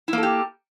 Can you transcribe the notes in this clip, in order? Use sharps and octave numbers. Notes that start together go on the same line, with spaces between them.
A#3 E4 G4 A4